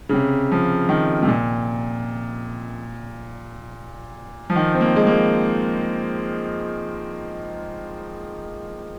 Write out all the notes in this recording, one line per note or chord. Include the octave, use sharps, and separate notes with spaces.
C#3
C3
F3
D#3
C3
A#2
F3
D#3
C4
A#3
G#3
A#3